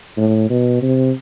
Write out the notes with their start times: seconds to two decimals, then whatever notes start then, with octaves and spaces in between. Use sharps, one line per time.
0.17 A2
0.50 B2
0.82 C3